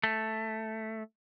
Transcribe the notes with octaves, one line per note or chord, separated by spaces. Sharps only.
A3